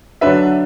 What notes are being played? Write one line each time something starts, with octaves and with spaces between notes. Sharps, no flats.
D3 F#3 D4 B4 E5